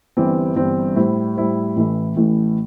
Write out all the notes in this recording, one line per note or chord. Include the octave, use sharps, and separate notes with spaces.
G1 G2 E3 C4
G1 G2 E3 C4
A2 G3 E4 C5
A2 G3 E4 C5
A1 A2 E3 A3 E4
A1 A2 E3 A3 E4